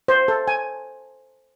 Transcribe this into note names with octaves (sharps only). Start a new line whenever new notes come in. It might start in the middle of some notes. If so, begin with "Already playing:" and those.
C5
A4
G#5